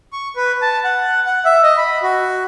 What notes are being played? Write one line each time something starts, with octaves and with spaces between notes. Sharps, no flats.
C#6
B4
A5
F#5
F#5
E5
D#5
B5
F#4